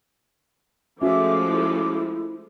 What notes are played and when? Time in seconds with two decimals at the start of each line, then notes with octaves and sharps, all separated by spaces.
1.01 F3 G#3 A3 C#4 F#4 E5 D6
1.48 E4